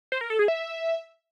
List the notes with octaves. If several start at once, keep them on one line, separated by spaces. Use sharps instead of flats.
C5
A#4
A4
G#4
E5